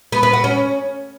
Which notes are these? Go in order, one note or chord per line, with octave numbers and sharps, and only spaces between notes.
B3
B4
F#4
C#4